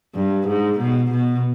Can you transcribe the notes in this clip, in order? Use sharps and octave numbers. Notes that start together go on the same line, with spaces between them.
G2
G#2
B2
B2